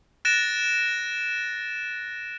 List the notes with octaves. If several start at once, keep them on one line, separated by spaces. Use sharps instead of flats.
F#6 A6 A#6 D7 E7